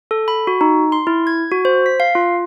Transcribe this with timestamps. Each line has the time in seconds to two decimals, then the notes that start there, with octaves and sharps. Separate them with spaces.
0.11 A4
0.28 B5
0.47 F#4
0.61 D#4
0.92 C6
1.07 E4
1.27 G#6
1.51 F#4
1.65 C5
1.86 B6
2.00 F5
2.15 F4